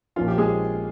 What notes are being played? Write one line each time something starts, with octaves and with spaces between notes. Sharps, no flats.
A#1 A#2 F3 A#3 C#4 F4
G4
G#3 G#4